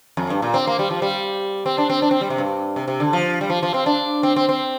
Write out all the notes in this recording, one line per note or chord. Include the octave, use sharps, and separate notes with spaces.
F2
G2
A#2
C4
A#3
G3
F3
G3
C4
D4
C4
D4
C4
G3
C3
G2
C3
C3
D3
F3
G3
F3
F3
C4
D4
C4
C4
C4